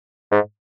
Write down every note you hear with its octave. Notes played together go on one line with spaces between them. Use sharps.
G#2